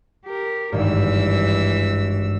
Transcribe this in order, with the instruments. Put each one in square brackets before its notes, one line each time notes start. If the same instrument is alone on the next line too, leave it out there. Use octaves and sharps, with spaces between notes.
[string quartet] G4 A#4
[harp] G#1 G2 [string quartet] E3 E6